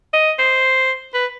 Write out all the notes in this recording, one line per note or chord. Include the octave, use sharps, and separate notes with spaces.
D#5
C5
B4